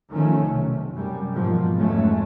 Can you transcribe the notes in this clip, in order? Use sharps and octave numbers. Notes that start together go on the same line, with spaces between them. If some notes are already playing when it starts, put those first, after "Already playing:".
D#3 F3 A3 C#4
B1 C3
F#2 C3 G3
G#2 B2 F3 A#3
B1 F2 F#3 G#3 A3 C#4